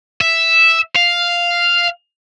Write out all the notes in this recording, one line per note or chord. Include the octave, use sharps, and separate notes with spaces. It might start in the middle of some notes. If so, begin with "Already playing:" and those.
E5
F5